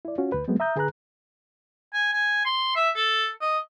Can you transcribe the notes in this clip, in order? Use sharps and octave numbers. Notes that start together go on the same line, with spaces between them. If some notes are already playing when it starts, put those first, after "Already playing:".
E4 D5
C#4 F4 F#4
D2 B4
F#3 G#3 A3 B3 C4
E5 A#5 D#6 G6
D3 G#4 B4 A#5 F#6
G#5
G#5
C6
E5
A4
D#5